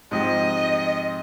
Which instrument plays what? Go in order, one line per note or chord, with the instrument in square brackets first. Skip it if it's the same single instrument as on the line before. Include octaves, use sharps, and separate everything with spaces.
[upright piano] G#2 F3 C4 G4 [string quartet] D#5